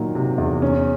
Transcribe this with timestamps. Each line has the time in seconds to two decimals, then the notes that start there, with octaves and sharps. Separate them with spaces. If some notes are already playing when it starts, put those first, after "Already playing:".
Already playing: A#2 D#3 F#3
0.15 C3
0.38 E2
0.62 C#4